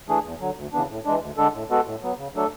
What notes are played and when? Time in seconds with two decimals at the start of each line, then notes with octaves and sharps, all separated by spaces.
0.08 E3 A3 D4 G#4
0.24 E2
0.41 D3 F#3
0.57 D2
0.73 C#3 E3 B3 D4
0.89 A2
1.05 E3 G#3 D4
1.21 D2
1.37 D3 G#3 D4 A4
1.54 A2
1.70 G#3 B3 F#4 A4
1.86 A2
2.02 F#3 B3
2.18 C#3
2.35 F#3 A3 D4 A4